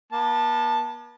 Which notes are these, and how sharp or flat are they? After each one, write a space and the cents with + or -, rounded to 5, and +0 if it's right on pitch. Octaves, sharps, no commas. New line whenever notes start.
B3 -45 A5 +0